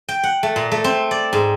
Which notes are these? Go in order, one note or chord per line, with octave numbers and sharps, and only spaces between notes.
G5
F#5
A3
A#2
A3
C4
D5
G#2